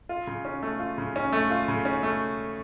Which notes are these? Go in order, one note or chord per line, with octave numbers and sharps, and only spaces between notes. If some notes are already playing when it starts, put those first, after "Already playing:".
F4
C#3
C#4
A3
F4
C#3
C#4
A3
F4
C#3
C#4
A3